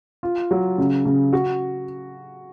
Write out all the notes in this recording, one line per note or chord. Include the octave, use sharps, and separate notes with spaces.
F4
F#3
C#3
C#3
F#4